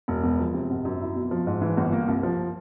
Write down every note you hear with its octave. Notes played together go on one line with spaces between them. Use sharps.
E1
E2
F3
C3
G#1
F#2
E4
B2
F3
G#2
E3
G1
A#3
C2
F3